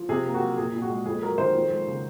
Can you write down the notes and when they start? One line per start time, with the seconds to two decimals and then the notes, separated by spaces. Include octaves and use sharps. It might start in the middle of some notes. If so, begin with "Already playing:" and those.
Already playing: F3
0.09 C3 G#4
0.25 A#3
0.34 F#4
0.42 F#3
0.57 A#2 G#4
0.73 A#2
0.82 F#4
0.90 G#3
1.06 F2 G#4
1.22 F#3 A#4
1.38 D#3 C5
1.54 F2
1.71 G#3
1.87 C#3